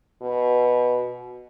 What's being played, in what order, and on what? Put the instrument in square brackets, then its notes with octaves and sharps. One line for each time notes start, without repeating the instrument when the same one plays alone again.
[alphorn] B2